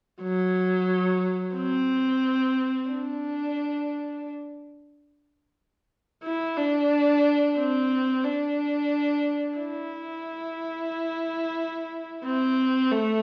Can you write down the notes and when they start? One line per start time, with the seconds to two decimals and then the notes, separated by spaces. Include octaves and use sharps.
0.22 F#3
1.56 C4
2.89 D4
6.23 E4
6.57 D4
7.57 C4
8.24 D4
9.58 E4
12.25 C4
12.91 A3